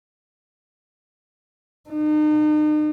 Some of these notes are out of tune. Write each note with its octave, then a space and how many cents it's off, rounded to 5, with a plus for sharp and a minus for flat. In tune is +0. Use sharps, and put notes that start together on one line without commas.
D#4 -40